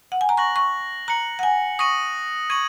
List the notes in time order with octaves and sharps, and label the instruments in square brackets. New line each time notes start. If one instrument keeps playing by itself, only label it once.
[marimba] F#5
G#5
A#5
[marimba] C#6 [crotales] F#6 A#6 F#7
[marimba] C#6
[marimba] A#5 [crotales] F#6 C#7 F#7
[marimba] F#5
G#5
[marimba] C#6 [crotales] D#6 A#6 D#7 F#7
[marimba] C#6 [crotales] G#6 D#7 F#7